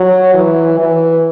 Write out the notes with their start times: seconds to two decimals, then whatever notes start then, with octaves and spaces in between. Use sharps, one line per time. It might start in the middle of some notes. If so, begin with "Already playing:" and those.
Already playing: F#3
0.34 E3
0.79 E3